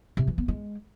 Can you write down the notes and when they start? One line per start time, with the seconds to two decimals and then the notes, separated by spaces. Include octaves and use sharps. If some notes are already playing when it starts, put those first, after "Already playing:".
0.17 C3
0.27 E3
0.38 B3
0.48 G#3